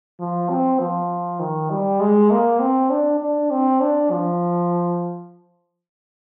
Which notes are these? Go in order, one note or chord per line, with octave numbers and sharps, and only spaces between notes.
F3
C4
F3
D#3
G3
G#3
A#3
C4
D4
D4
C4
D4
F3